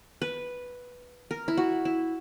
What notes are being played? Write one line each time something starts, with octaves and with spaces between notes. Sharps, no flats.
B4
A#4
E4
F#4
E4